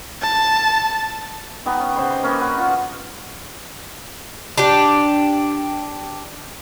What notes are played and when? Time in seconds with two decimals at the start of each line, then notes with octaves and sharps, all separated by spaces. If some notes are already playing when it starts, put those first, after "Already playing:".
0.22 A5
1.66 B3 D#4 G4
1.80 C#4
1.96 C#3 C5 D#5 C6
2.23 A#3 C#4 D#4 B4
2.40 F#4 B4
2.58 F4
4.58 D4 G4